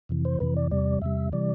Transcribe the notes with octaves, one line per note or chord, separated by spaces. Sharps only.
F2 C3 E3
C5
F2 C3 E3 B4
D5
E2 C3 G3 D5
E2 C3 G3 E5
C3 E3 G3 D5